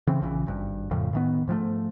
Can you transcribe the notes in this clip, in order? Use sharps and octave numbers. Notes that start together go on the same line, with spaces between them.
C#3 E3 C4
A#1 C#3 E3
G#1 G2
F2 A2 C#3 F3
A2 D#3 B3
G#2 F3 G3 A3